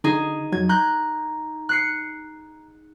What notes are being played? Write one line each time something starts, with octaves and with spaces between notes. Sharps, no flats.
D3 D#4 G#4
F2 F#3 G#6
A#5 F#6 G6
F#6 C7 C#7